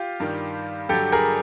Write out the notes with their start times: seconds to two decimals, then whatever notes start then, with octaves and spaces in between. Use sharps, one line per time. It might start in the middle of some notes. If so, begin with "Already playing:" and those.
Already playing: F4 G4
0.20 G2 D#3 G3
0.89 G2 D3 F#3 G4 A4
1.12 G#4 A#4